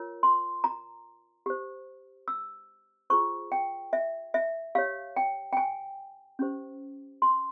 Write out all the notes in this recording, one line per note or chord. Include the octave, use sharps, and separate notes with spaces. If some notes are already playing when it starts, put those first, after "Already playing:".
Already playing: F4 A#4 C#5
C6
A#5
G4 C5
E6
F4 G#4 C5 C#6
G5
E5
E5
G4 C#5 F5
G5
G5
G#5
C#4 G4 C5
C6